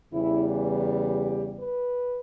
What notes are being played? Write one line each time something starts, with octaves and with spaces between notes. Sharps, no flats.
E2 C#3 E3 G3 E4
G4
B4